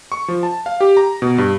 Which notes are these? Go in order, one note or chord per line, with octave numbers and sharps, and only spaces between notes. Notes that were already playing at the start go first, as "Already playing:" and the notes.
C#6
F3
A5
F5
G4
A#5
B2
G2